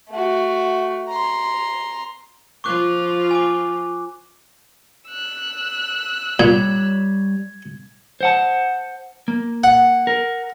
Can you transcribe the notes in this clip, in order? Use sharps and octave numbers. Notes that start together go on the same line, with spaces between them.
A3 F#4
A#5 C6
F3 F4 C#6 D6 F#6
G#5 D6
E6 F#6
A#2 G3 C#5 G#6
C5 F#5 A5
A#3
F#5
A#4